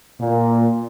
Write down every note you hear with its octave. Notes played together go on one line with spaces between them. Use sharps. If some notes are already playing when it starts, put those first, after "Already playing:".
A#2